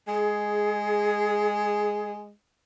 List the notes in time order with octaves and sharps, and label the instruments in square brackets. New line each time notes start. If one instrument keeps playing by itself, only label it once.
[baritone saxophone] G#3 [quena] G#4